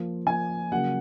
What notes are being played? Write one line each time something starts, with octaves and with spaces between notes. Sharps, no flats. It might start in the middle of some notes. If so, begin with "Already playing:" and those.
Already playing: F3 A#3 F4
F3 A#3 F4 G#5
C#3 F#3 A#3 F#5